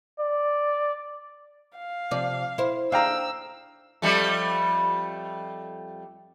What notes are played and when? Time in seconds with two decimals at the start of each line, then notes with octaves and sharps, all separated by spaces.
0.20 D5
1.78 F5
2.11 C3 F3 D5
2.58 E4 C5
2.92 D4 G#4 F5 G5 A#5 E6
4.02 F2 G3 A3